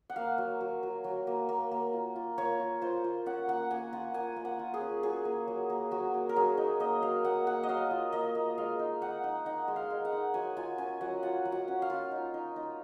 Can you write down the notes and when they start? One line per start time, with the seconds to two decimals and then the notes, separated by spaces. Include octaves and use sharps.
0.10 F#5
0.16 A#3 F5
0.38 F#3
0.61 F#3
0.83 F#3
1.04 F#3
1.27 A#3
1.49 A#3
1.71 A#3
1.93 F4
2.16 F4
2.38 A#3 C#5
2.60 F4
2.82 F4 C5
3.04 F4
3.26 C#4 F#5
3.48 A#3 F#5
3.71 A#3 G#5
3.93 F4 F#5
4.14 A#3 G#5
4.36 A#3
4.45 F#5
4.59 F4
4.74 G#4
4.81 C#4
5.03 F#3 G#4
5.25 A#3
5.47 F#3
5.70 A#3
5.91 F#3 F#4
6.14 A#3
6.29 A#4
6.36 F#3 G#4
6.58 D#4
6.80 A#3 D#5
7.02 F#3 F5
7.24 A#3 F#5
7.47 A#3 F#5
7.63 D#5
7.69 F#3 F5
7.91 F4
8.13 A#3 D#5
8.35 A#3
8.58 G#3 F5
8.79 D#4
9.01 D#4 F#5
9.24 D#4
9.46 D#4 F#5
9.68 G#3
9.76 F5
9.90 G#3
10.05 F#5
10.13 D#4
10.34 F#3 G#5
10.57 F4 G#5
10.78 C#4 G#5
11.01 F#3 F#5
11.23 F4 F#5
11.45 F#3
11.52 F#5
11.68 C#4
11.82 F5
11.90 F4
12.12 D#4
12.34 D#4
12.56 D#4